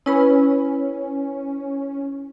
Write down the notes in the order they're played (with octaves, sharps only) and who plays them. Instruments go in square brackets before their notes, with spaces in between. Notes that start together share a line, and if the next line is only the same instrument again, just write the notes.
[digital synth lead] C#4 [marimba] E4 B4 B5